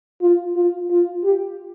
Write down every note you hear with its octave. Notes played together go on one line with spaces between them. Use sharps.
F4
F4
F4
G4